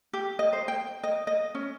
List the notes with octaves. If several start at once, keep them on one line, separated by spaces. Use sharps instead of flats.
G4
D#5
C5
G5
D#5
D#5
C#4